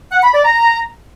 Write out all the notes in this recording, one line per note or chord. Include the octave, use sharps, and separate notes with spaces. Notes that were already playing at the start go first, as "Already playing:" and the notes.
F#5
B5
D5
A#5